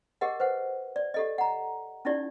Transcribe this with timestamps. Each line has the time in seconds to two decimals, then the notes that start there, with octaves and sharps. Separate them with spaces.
0.21 G4 G#4 A#4 D#5 F#5
0.40 B4 C5 F#5
0.96 D5
1.14 G4 A4 D#5
1.38 F#5 A#5
2.05 C#4 D#4 E4 G4 D5